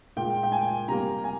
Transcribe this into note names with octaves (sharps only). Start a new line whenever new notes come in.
A#2 G#3 G5
G5
G#5
C3 G3 A#3 A#5
G#5